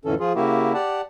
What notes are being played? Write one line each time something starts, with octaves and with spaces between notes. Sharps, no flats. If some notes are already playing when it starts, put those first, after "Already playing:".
F2 A2 D3 E3 C#4 A4
F3 F4 G#4
C#3 A#3 E4 F#4 G4
G4 D5 F#5 A5